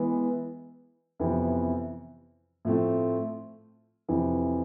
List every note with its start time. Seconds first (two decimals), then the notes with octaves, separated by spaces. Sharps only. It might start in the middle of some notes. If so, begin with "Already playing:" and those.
Already playing: E3 G#3 B3
1.19 F2 C3 E3 B3 E4
2.65 A2 F3 A3 C4
4.08 F2 C3 E3